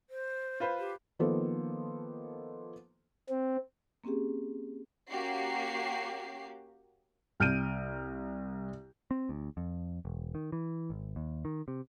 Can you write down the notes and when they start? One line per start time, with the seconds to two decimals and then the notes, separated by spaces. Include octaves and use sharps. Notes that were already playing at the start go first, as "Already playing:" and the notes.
0.10 C5
0.60 F4 B4 C5
0.79 G4
1.19 D#3 F3 A#3 B3 A4 C5
3.30 C4
4.04 A#3 C4 C#4 G4 G#4
5.09 A#3 C#4 F#4 G4 C7
7.40 C2 F6 G6 D7 D#7
9.11 C4
9.29 D2
9.57 F2
10.05 E1
10.35 D#3
10.52 E3
10.90 G#1
11.16 D#2
11.45 D#3
11.68 C3